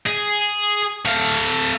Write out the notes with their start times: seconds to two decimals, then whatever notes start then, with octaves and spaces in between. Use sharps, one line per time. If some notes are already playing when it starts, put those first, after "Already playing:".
0.06 G#4
1.05 A3 F5